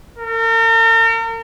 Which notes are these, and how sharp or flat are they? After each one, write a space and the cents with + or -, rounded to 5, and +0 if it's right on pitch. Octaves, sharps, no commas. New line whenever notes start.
A#4 -40